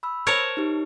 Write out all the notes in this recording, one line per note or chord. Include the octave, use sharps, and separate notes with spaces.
B5 E6
A#4 C5 C#5 A5
D#4 G4